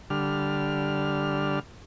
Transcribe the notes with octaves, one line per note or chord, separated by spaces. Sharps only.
D3 G3 F6